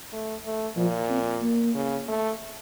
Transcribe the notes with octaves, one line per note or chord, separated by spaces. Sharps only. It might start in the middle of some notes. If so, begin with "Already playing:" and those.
A3
A3
A#2 F3
C4
A#3
C#3
A3